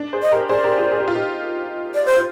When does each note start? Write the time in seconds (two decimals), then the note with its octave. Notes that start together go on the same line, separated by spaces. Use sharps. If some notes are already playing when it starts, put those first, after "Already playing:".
Already playing: D4
0.13 G#4 C5
0.22 D#5
0.31 G4 A#4
0.49 G#4 C5 D5
0.64 G4 A#4
0.78 F4 G#4
0.92 G#4
1.00 G4
1.08 F4
1.15 D#4 G4
1.94 D5
2.06 C5
2.16 F4